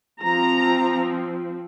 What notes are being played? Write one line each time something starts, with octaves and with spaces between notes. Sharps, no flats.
F3 C4 A#5